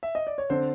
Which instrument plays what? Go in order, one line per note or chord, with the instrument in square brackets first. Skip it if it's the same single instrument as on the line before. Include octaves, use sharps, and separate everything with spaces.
[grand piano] E5
D#5
D5
C#5
D3 C4 C5